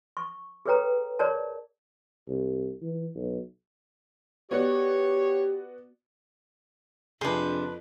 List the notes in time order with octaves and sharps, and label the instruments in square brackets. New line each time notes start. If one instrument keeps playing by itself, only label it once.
[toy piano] C#6
G#4 A4 B4 C#5 G5 A#5
G#4 A#4 C#5 D5 A5
[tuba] C2
E3
B1
[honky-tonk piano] B3 F#4 D5 [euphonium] G4 [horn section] C#5
[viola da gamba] F2 [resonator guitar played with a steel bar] C3 D4 [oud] G#4 [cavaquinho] B4 C6